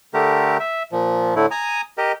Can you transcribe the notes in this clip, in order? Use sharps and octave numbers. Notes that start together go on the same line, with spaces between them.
D3 A3 G4 A#4
E5
A#2 F3
A2 D3 A3 E4
G#5 A#5 D#6
G4 A#4 D#5